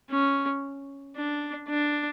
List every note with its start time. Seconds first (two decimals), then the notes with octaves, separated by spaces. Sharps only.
0.10 C#4
1.16 D4
1.69 D4